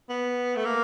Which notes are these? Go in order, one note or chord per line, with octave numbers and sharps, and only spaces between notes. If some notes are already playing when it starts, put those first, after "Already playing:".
B3
A3
A#3